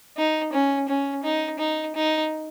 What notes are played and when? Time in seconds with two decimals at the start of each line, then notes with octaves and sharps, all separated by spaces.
0.17 D#4
0.53 C#4
0.88 C#4
1.23 D#4
1.59 D#4
1.95 D#4